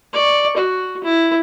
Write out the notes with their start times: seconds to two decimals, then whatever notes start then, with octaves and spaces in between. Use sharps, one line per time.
0.13 D5 C#6
0.57 F#4
1.04 E4